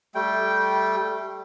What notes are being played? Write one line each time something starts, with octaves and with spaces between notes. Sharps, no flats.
G3 A3 G5